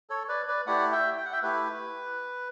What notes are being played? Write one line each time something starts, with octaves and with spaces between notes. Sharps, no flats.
A4 C#5
B4 D5
B4 D5
A3 E4 G4 D5 F#5
E5 G5
G5
F#5
E5 G5
A3 E4 G4 B4